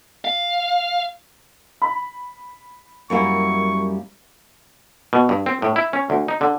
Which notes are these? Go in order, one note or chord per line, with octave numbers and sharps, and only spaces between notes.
F5
B5
F#2 G3 A#3 E4 C#6
B2
G2
C4
A2
E4
C#4
D2
D#4
D3